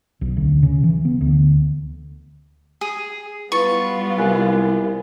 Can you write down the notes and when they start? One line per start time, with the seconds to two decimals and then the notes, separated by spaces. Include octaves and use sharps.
0.21 B1
0.37 D2
0.63 C#3
0.84 E3
1.05 B3
1.21 D2
2.81 G#4
3.52 G3 B3 E4 F4 B4 C#6 A6
4.18 C2 A#4 G#5 F#6